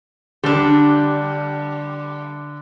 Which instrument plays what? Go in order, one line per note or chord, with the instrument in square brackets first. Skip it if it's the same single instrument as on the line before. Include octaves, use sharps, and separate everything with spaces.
[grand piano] D3 [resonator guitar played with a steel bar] G3 D4